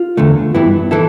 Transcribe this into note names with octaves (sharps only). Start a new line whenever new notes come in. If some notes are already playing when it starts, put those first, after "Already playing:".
Already playing: F4
E2 D3 A3
G2 E3 B3 E4
E3 B3 E4 A4